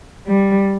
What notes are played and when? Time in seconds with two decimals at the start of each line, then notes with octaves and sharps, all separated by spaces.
0.26 G3